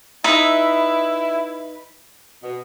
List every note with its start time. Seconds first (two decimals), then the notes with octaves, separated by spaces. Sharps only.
0.24 D#4 E4 B4 E5
2.42 B2